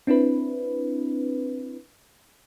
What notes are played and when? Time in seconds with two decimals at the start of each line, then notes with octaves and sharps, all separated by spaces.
0.07 C4 D4 E4 B4